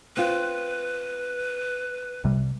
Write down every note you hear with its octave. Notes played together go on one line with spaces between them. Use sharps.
C4 F4 B4
C2 C3 G3